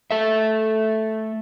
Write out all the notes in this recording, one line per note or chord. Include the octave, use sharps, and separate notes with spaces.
A3 A4 E5